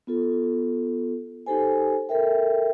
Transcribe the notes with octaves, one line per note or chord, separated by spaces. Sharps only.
B3 F4 A4
D#4 G4 A4 C5 G#5
A4 A#4 E5 G5